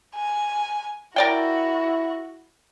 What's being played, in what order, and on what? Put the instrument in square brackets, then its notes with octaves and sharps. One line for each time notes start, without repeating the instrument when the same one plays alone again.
[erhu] G#5
[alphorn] E4 [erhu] F#4 [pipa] A#4 D5 G5